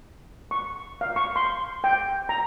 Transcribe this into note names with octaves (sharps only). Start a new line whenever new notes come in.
C#6
F5
C#6
C6
G5
A#5